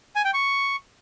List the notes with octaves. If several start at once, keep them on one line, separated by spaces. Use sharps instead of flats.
G#5
G5
C#6